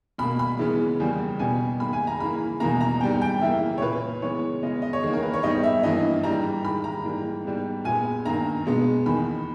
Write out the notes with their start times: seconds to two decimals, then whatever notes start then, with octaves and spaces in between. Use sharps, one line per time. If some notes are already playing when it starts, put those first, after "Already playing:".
0.18 B2 A#3 B5
0.39 B5
0.59 C#3 E3 G#3 B3
1.00 E2 C#3 G3 A#3
1.39 B2 G3 B3 G#5
1.80 G#2 D#3 A#3 B5
1.93 G#5
2.07 A#5
2.20 C#3 E3 A#3 B5
2.60 E2 B2 A#3 A#5
2.81 A#5
3.01 G#2 G3 B3 G5
3.22 G5
3.41 C#3 E3 A#3 E5
3.78 C#5
3.81 A#2 A#3 B4
4.22 C#3 E3 G#3 B3 C#5
4.63 C#3 G#3 B3 D#5
4.82 D#5
4.93 C#5
5.03 E2 D#3 A#3 G#4
5.13 A#4
5.23 B4
5.34 C#5
5.43 G#2 G3 B3 D#5
5.63 E5
5.83 G2 E3 A#3 D#5
6.23 G#2 E3 G3 A#5
6.64 G#2 D#3 G#3 B5
6.84 A#5
7.04 G#2 E3 G3 A#3
7.44 G#2 G3 B3
7.84 A#2 G#3 B3 G#5
8.26 G2 D#3 A#3 A#5
8.66 B2 G#3 B3
9.06 E2 D#3 A#3 B5